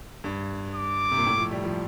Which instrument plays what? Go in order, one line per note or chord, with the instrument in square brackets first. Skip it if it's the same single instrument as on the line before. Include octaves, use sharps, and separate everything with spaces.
[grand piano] G2
[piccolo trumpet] D6
[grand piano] C3
A#2
A2
F3
G3
F3